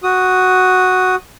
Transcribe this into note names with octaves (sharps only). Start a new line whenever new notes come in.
F#4 D#6